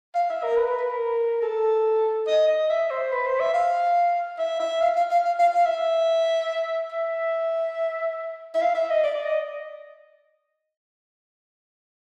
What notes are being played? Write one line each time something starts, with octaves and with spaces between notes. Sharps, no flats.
F5
E5
A#4
B4
B4
B4
A#4
A4
D#5
D#5
E5
C5
B4
C5
E5
F5
E5
E5
F5
F5
F5
F5
F5
F5
E5
E5
E5
F5
E5
D#5
D5
D5
D#5